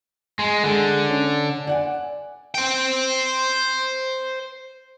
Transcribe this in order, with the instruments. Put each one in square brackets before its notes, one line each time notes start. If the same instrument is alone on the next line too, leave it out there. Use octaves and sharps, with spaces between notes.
[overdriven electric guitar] G#3
[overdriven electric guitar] D3 [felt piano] G#3
[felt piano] C#4
D5 F#5 G#5
[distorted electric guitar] C5 G5